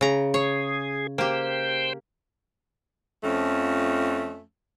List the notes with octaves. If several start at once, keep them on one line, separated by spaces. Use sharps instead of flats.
C#3 A#5
G#4 C#5
A#3 G4 C5 G5
F2 F3 A3 C#4